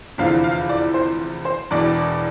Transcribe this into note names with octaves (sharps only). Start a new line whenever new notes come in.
F1 E2 D3 F3 F5
F5
D5
C5
C5
E1 E2 B2 D5